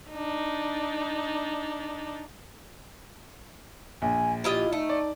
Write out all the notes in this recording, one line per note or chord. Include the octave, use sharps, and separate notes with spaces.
D4 D#4
A#1 G#5
E4 F4 G4 D#5
A3 D#4
D5